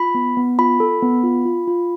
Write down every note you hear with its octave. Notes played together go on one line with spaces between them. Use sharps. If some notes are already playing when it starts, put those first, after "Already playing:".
Already playing: F4 B5
B3
B3
F4 B5
A4
B3
F4
F4
F4